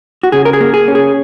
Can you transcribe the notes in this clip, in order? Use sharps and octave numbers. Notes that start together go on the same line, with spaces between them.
F#4
C#3 G#4
A#4
G#4
A#3
G#4
C#4
G#4